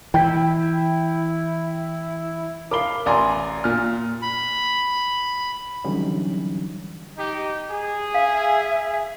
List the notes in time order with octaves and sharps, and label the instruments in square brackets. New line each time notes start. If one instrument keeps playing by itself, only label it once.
[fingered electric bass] E3 [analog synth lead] E4 [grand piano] G5
[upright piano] A#4 G7 [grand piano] F5 B5 D6
[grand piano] A1 A#5 [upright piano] D5 G#5 C6
[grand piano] A#2 F6
[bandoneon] B5
[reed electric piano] D3 E3 F#3 G3 C#4 D#4
[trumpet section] D#4 G4
G#4
[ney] E5 [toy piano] F5